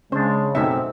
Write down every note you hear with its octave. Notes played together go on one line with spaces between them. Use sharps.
C#3 G#3 C#4 D4 C5
B1 F#2 A3 C4 D#4 E5